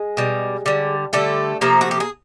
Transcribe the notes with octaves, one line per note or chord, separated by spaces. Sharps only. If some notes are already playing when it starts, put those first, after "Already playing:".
Already playing: G#3 G#4
B2 G3
D3 G3
D3 G3 A3 A4
C3 F3 A3 A#3 A#4
F#4
G4
G#4